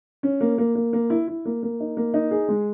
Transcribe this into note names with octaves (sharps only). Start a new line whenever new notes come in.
C#4
A#3
A#3
A#3
A#3
E4
E4
A#3
A#3
D#4
A#3
D#4
G#4
G#3